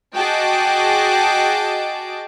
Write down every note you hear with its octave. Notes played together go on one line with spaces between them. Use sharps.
F#4 G#4 D#5 G5 A5 D6